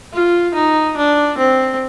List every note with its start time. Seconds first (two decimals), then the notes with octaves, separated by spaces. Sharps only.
0.13 F4
0.55 D#4
0.97 D4
1.38 C4